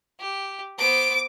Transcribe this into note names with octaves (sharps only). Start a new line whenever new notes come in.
G4
B3 C5 D6